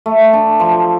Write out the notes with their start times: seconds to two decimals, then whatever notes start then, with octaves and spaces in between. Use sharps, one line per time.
0.06 A3
0.33 D4
0.60 F3